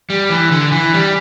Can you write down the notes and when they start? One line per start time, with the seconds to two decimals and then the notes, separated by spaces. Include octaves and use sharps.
0.10 G3
0.30 E3
0.51 D3
0.72 E3
0.93 G3